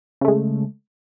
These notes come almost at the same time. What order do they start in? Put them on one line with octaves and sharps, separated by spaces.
C#3 A3 G#3